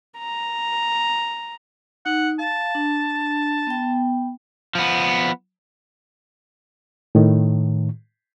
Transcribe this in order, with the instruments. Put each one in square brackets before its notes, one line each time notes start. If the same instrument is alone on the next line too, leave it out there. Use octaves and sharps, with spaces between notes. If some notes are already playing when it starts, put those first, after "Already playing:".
[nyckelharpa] A#5
[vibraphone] D#4 [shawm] F#5
[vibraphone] F5 [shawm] A5
[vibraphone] D4
B3 G5
[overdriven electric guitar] F3 B3
[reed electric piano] A2 D#3